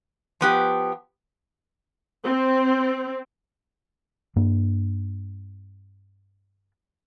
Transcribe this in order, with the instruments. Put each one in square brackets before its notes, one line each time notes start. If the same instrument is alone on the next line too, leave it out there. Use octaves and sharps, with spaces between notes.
[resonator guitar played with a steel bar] F3 B3 G4
[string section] C4
[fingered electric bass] G2 A#3 D4